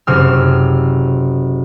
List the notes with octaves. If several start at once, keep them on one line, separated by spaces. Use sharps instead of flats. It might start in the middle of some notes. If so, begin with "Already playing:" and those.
F#1 C3 E6 F6